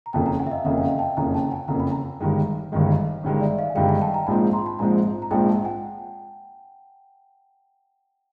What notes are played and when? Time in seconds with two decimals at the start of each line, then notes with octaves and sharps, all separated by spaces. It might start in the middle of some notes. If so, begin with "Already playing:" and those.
0.06 A#5
0.13 F#1 F2 C#3 G5 A5
0.26 G#5 A#5
0.39 F#5 G#5
0.47 E5
0.52 D#5 F5
0.64 F#1 F2 C#3 E5 F#5
0.78 G#5
0.82 F5 G5
0.99 G5 A5
1.17 F#1 F2 C#3 G#5 A#5
1.34 G5 A5
1.51 F#5 G#5
1.68 F#1 F2 C#3 A#5
1.80 B5
1.91 G#5 A#5
2.20 G1 G2 D#3 G#3
2.72 G1 G2 D#3 G#3
3.23 G1 G2 D#3 G#3
3.40 D5 E5
3.58 D#5 F5
3.70 G#5
3.75 G1 G2 D#3 G#3 F5 G5
3.89 F#5 G#5
4.01 G5 A5
4.14 G#5 A#5
4.27 A#1 G#2 F3 G#3 C4 A5 B5
4.53 A#5 C6
4.66 A5 B5
4.79 A#1 G#2 F3 G#3 C4 G#5 A#5
5.22 A#5
5.31 A#1 G#2 F3 G#3 C4 G5 A5
5.47 G5 A5
5.65 F#5 G#5